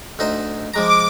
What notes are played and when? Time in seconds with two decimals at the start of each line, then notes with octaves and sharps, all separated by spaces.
0.19 D2 D#4 C5
0.74 F3 G#3 A#5 D6